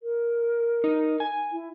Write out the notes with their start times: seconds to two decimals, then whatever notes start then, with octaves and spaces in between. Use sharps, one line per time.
0.03 A#4
0.84 D#4
1.20 G#5
1.52 E4